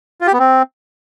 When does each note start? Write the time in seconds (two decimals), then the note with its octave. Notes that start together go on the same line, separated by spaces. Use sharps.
0.21 F4
0.27 G4
0.33 B3
0.39 C4